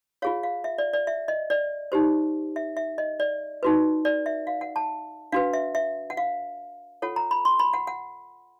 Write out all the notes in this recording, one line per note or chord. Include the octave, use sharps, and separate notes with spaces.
F4 G#4 C#5 F5
F5
E5
D5
D5
E5
D#5
D5
D#4 G4 C5
E5
E5
D#5
D5
D#4 F#4 B4
D5
E5
F5
F#5
A5
D4 F#4 B4 F5
E5
E5
F#5
F5
F4 A4 C#5 F#5
A#5
B5
C6
B5
F#5
F#5